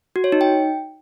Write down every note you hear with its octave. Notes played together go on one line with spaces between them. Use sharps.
F#4
C#5
D#4
G5